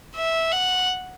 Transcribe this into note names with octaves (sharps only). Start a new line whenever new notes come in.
E5
F#5